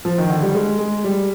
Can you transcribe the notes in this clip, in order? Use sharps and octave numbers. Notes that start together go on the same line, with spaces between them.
F3
D#3
D3
G3
G#3
G#3
G3